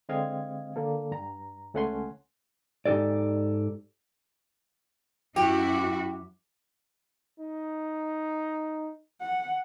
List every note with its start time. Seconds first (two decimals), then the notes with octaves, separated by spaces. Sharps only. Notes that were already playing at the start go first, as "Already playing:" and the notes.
0.09 D3 G#3 C4 D#5 F5 G#6
0.76 D3 A#3 A4
1.11 G2 A#5
1.74 C#2 A3 C#4 F#5 G#5 C6
2.86 G#2 D#4 G4 A4 D5
5.36 F#2 E4 F#4 G4
7.39 D#4
9.21 F#5